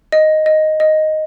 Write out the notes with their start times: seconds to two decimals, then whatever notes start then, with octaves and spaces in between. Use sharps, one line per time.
0.12 D#5
0.46 D#5
0.80 D#5